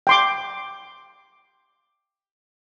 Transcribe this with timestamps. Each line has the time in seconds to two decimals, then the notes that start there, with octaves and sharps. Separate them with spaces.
0.07 G5 C6 D6